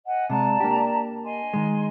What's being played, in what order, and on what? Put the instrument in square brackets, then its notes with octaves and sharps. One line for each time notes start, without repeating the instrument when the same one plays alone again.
[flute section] D#5 F#5 G#5
[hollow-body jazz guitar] C3 G#3 [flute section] D5 A5 A#5
[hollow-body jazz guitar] A#3 D4 G4
[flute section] D#5 G#5 C6
[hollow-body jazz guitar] D#3 G#3